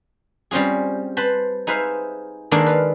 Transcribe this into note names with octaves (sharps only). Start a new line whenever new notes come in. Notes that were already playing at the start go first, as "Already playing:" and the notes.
G3 C4 C#4 F4 G#4
B4 C5 A5 B5 C6
D#4 G#4 B4 C5 E5 F5
D#3 G#3 A#3 D4 A4
B4 F5